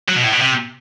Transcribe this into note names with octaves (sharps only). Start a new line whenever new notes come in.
F#3
B2
A2
B2
C3